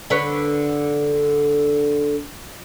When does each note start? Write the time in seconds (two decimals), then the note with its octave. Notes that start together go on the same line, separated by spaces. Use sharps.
0.10 D3 B4 C#5